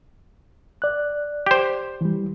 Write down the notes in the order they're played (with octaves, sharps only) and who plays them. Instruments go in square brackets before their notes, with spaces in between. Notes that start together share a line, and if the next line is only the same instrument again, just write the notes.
[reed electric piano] D5 F#6
[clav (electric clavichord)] G4 C5
[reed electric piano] E3 G3